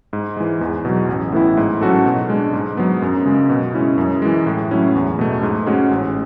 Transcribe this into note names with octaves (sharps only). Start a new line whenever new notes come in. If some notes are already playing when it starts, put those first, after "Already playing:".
G#2
E3 G#3
E2
B2 F#3
A1
A2 E3 B3 E4
G#2
F#3 C#4 F#4 A4
B2
G#3 D4
G#2
F#3 B3
F#2
C#3 G#3
B2
G#3 C#4 E4
F#2
E3 G#3
A2
F#3 C#4 E4
E2
B2 A3
G#2
G#3 C#4 F#4
A1